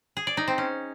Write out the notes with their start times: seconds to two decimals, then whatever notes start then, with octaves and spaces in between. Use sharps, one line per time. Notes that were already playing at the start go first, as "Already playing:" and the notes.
0.17 G#4
0.27 D5
0.37 D#4
0.48 C4
0.58 C#4